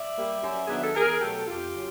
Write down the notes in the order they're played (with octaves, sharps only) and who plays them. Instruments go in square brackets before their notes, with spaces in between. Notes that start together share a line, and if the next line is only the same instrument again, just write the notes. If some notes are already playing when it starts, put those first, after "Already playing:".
Already playing: [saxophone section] D5 E5
G3 A#3
F#2
D#3 F#3 B3 D4 G#4
A4
E2 G#4 A#4
B2 F#3 A3 G4 A4
F2 F4 G4
C#3 F#3